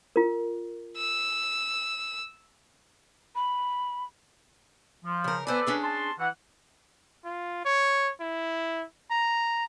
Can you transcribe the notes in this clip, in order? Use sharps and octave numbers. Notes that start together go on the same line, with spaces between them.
F4 A#4
E6
B5
F3
C#3 A#4
B3 A4 B4 C5 D5 G#5
C#4 D4 G#4
A5 C6
E3 F#5
F4
C#5
E4
A#5